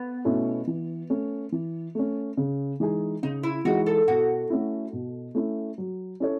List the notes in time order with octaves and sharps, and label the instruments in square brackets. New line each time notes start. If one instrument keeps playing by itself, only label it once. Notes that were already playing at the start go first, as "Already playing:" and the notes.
Already playing: [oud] B3
[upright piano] B2 A3 C#4 E4
E3
A3 C#4
E3
A3 C#4
C#3
E3 G#3 D#4 G#4
[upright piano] C#3 [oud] D#4
[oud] E4
[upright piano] E3 G#3 D#4 G#4 [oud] F#4
[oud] A4
[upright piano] B2 [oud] F#4
[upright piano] A3 C#4 E4
B2
A3 C#4 E4
F#3
C#4 E4 A4 C#5